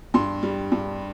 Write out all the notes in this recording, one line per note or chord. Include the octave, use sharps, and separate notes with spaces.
G2 C6
G3
G2